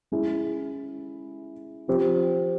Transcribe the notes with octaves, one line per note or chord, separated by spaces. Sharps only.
G#3 C#4 E4 G#4
F3 C4 G4